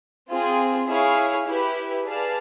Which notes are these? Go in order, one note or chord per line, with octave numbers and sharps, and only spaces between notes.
C4 F4 G#4
E4 G#4 C#5 F5
E4 G4 B4
G#4 B4 D5 F5 A5